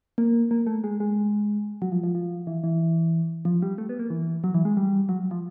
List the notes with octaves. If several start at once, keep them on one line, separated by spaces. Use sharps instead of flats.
A#3
A#3
A3
G#3
G#3
F#3
F3
F3
F3
E3
E3
F3
G3
A3
B3
A#3
E3
F#3
E3
G#3
G3
F#3
F3